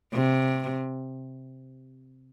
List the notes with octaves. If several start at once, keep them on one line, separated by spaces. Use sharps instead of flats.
C3